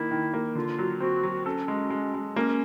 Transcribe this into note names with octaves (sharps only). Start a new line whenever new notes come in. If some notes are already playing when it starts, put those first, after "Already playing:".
Already playing: D#3 A#3 E4
D#3
A#3
D3 F4
F#3
C4 F#4
F#3
C#4 A4
G#3
G#3
G#3
A#3 C#4